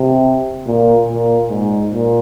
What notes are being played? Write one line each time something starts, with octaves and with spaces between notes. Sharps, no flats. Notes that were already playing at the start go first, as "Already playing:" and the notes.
Already playing: C3
A#2
A#2
G#2
A#2